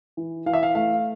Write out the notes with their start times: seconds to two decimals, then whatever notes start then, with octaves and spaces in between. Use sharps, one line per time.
0.17 E3
0.46 E3 F5
0.53 E5
0.63 F5
0.75 A3 F5